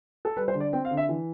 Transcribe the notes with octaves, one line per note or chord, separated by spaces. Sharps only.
A4
G3 B4
C5
D3
D5
C4 G5
F5
D3
E5
E3